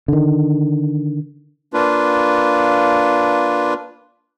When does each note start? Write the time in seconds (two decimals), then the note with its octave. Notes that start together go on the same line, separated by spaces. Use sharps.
0.08 D3 D#3
1.74 A#3 D4 F4 B4